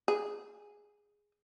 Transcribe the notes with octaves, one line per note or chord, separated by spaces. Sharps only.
G#4